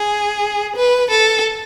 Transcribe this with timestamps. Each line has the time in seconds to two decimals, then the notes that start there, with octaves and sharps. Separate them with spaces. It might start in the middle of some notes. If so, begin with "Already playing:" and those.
Already playing: G#4
0.76 B4
1.10 A4